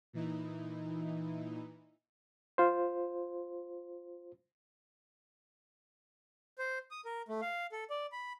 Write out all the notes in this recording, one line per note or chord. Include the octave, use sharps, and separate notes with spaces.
A#2 E3 D#4 E4
F4 C5
C5
D#6
A#4
A3
F5
A4
D5
B5